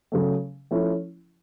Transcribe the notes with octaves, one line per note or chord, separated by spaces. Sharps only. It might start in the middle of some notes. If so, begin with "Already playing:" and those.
C#3 F#3 A3
F3 A3 C#4 E4